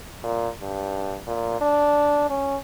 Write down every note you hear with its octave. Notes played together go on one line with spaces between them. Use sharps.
A#2
G2
A#2
D4
C#4